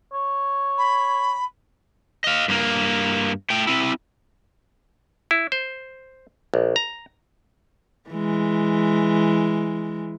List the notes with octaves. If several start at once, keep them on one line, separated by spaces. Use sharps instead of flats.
C#5
B5
D#5 F5
G2 A#3
A3 G5
C4 E4
E4
C5
A#1
A#5
E3 G#3